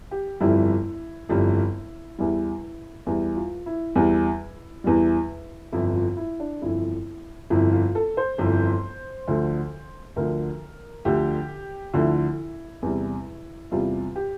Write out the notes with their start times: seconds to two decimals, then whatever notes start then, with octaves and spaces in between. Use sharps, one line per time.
0.11 G4
0.40 G1 F2 E3 G3 E4
1.29 G1 F2 E3 G3
2.18 E2 E3 G3 E4
3.06 E2 E3 G3 E4
3.36 F4
3.66 E4
3.95 E2 E3 G3
4.84 E2 E3 G3
5.73 G1 F2 E3 E4
5.95 F4
6.17 E4
6.40 D4
6.61 G1 F2 E3 E4
7.50 G1 F2 E3 E4
7.73 F4
7.95 A4
8.17 C5
8.38 G1 F2 E3
9.27 D2 D3 F3
10.16 D2 D3 F3 A#4
11.05 D2 D3 F3 G4
11.94 D2 D3 F3 E4
12.82 E2 C3 G3
13.71 E2 C3 G3 F4
14.16 G4